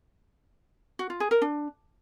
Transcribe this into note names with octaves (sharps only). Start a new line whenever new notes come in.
F#4
F4
G#4
A#4
D4